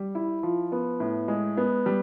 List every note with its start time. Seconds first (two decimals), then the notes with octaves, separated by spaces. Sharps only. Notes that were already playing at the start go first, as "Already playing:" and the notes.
Already playing: G3
0.15 E4
0.43 F3
0.72 B3
1.00 A2
1.28 G#3
1.57 B3
1.86 G3